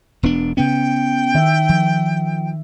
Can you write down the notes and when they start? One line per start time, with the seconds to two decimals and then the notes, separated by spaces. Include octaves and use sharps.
0.23 E1 B3 D4
0.57 C#3 B3 C#4 G5
1.35 D#3 E5
1.69 F3